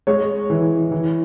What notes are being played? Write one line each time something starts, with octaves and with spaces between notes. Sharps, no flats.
G#3 C#5
E3
E3